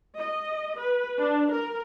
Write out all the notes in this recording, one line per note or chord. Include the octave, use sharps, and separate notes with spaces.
D#5
B4
D4
A#4